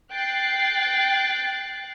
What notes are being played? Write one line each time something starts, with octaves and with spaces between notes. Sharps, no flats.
G5 F#6 A6 C7